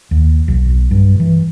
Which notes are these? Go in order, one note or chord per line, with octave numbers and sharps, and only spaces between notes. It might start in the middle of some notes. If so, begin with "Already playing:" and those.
D#2
B1
G2
E3